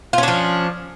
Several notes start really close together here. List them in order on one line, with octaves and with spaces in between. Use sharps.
F4 C#4 D4 F3